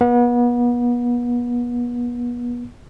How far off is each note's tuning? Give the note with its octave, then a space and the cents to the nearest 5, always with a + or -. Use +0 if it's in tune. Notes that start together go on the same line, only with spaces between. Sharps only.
B3 -35